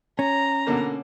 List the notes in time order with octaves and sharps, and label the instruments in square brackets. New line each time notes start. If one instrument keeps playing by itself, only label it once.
[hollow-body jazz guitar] C#4 [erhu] A#5
[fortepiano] B2 D3 A#3